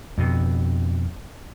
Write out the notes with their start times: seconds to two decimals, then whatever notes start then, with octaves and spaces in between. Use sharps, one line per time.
0.18 F2 B2